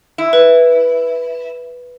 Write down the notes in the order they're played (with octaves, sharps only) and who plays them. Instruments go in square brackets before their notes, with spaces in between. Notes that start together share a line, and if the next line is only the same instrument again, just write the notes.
[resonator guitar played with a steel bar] E4
[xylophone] B4